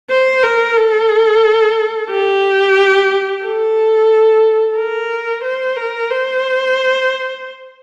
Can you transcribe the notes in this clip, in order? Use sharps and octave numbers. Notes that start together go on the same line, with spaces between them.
C5
A#4
A4
G4
A4
A#4
C5
A#4
C5